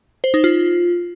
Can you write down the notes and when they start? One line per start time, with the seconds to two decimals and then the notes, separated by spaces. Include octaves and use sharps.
0.24 C5
0.34 D#4
0.44 F4